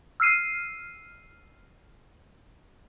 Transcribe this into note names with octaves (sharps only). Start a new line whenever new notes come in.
E6 F6 C7 D#7